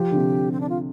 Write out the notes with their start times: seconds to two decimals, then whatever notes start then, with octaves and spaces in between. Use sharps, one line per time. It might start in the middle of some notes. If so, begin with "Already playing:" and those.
Already playing: F3 G4
0.12 D3
0.16 C3
0.52 C4
0.61 D4
0.69 F4